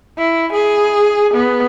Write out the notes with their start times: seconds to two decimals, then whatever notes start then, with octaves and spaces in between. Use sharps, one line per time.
0.18 E4
0.53 G#4
1.34 B3